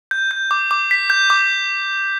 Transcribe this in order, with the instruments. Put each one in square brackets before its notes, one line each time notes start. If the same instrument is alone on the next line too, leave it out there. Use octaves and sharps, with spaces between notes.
[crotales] G6
G6
D6
D6
B6
G6
D6